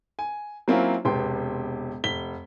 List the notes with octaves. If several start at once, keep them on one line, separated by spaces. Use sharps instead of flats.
G#5
F#3 A#3 C4 C#4 E4 F4
E1 C3 B3 G5 C6
F1 B6 G7